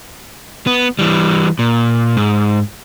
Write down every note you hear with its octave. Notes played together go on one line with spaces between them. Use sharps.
B3
E3 G3
A#2
G#2